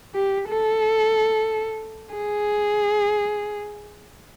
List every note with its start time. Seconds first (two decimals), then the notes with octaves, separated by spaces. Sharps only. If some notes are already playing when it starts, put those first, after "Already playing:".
0.15 G4
0.49 A4
2.15 G#4